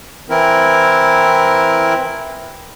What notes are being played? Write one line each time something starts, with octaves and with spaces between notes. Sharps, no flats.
E3 C4 E4 A#4